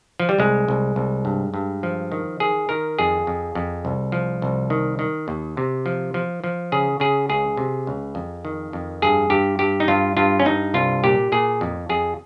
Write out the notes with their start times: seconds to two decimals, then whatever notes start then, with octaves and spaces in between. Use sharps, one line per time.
0.20 F3
0.29 G3
0.39 C2 G#3
0.68 C2
0.96 C2
1.25 G2
1.54 G2
1.83 F3
2.12 D#3
2.40 D#3 G#4
2.69 D#3 A#4
2.99 F2 G#4
3.27 F2
3.55 F2
3.85 C2
4.12 F3
4.42 C2
4.70 D#3
4.99 D#3
5.28 D#2
5.57 C3
5.86 F3
6.14 F3
6.44 F3
6.72 C#3 G#4
7.00 C#3 G#4
7.29 C#2 G#4
7.57 C3
7.87 C#2
8.15 F2
8.45 D#3
8.73 F2
9.02 G2 G#4
9.30 G2 G4
9.59 G2 G4
9.80 D#4
9.88 G2 F4
10.17 G2 F4
10.39 C#4
10.45 G2 D#4
10.74 C2 F4
11.04 A#2 G4
11.32 A#2 G#4
11.61 F2
11.89 F2 G#4